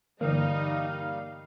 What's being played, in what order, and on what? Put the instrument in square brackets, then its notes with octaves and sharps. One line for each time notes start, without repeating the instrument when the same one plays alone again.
[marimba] G2 D3 E3 [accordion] G3 F5 [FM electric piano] A#3 [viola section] D#4